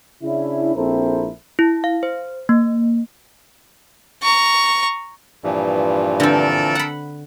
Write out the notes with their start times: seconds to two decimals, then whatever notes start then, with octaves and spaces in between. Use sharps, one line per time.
0.23 C#3 C#4 D4 E4
0.76 A#1 C4 E4 A4 A#4 C5
1.59 E4
1.84 F5
2.03 C5
2.49 A#3
4.22 A#5 C#6
5.44 G2 A#2 E3 F3
6.20 D3 C4 A4 A#4 D5
6.75 F#5 B5